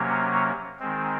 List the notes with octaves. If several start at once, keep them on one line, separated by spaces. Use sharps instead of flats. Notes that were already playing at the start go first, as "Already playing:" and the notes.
Already playing: C3 F#3 A#3 C#4
D#3 G#3 C4